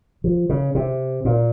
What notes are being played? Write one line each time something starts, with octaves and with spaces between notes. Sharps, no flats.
F3
C#3
C3
A#2